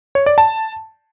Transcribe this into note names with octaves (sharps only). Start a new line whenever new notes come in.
C#5
D5
A5